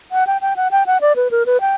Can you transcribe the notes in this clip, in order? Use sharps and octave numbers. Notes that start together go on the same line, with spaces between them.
F#5
G5
G5
F#5
G5
F#5
D5
B4
A#4
B4
G5